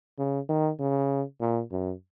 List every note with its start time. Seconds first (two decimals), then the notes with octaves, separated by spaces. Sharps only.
0.19 C#3
0.49 D#3
0.80 C#3
1.41 A#2
1.71 F#2